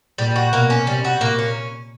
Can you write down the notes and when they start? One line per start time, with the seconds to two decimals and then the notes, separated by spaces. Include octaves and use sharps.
0.18 A#2 G3
0.36 F#4
0.53 B2 A#3
0.70 C#4
0.87 C3 G3
1.05 F#4
1.21 A#2 A#3
1.39 C#4